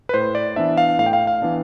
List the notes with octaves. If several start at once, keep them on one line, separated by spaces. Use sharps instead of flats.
B4
A2 C5
D5
E3 B3 D4 E5
F5
A2 F5
G5
F5
F5
E3 B3 D4